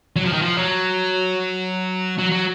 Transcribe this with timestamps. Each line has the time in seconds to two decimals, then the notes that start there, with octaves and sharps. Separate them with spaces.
0.16 F#3
0.25 F3
0.33 D#3
0.42 F3
0.57 F#3
2.18 F#3
2.31 F#3